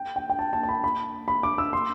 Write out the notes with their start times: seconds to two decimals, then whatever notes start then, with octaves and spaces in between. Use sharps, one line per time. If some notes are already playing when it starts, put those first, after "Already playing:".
Already playing: G5
0.16 G5
0.30 G5
0.39 A5
0.53 A5
0.63 A5
0.69 B5
0.84 B5
1.28 B5
1.43 D6
1.58 E6
1.73 C6